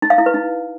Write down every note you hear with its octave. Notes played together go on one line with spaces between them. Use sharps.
D#4
F5
E4
B4
D#4